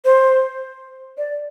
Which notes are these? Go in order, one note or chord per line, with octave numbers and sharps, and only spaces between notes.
C5
D5